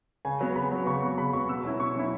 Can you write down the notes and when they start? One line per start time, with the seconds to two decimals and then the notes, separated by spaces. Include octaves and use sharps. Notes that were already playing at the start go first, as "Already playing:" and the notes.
0.25 C#3 G#5
0.41 F#3 B3
0.56 C#3 B5
0.72 F#3 B3
0.86 C#3 C#6
1.02 F#3 B3 C#6
1.18 C#3 B5
1.33 F#3 B3 C#6
1.49 B2 E6
1.65 F#3 C#4 E4
1.80 B2 C#6
1.96 F#3 C#4 E4